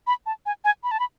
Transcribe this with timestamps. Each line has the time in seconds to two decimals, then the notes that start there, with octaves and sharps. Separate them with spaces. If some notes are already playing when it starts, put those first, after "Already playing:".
0.07 B5
0.26 A5
0.46 G#5
0.65 G#5
0.84 B5
0.91 A5
1.00 B5